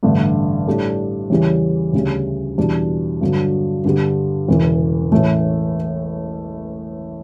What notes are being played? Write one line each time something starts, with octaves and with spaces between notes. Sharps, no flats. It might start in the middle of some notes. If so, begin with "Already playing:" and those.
A1 G2 D3 A3
A2 G3 D4 A4
E2 C#3 E3 G3 C#4
D2 C#3 G3
E2 B2 G3 D4
G2 D3 F#3
G2 D3 G3
E1 E2 C#3 E3
A1 A2 E3 A3 C#4